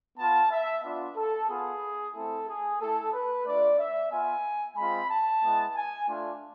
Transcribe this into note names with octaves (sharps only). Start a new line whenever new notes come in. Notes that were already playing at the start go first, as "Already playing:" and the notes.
B3 F4 A5
E5
B3 D4 F4
A4
B3 F4 G#4
A3 C4 E4 A4
G#4
A3 E4 A4
B4
A3 D4 F4 D5
E5
B3 F4 G#5
G#3 C4 F4 B5
A5
G#3 B3 E4
G#5
A3 D4 F4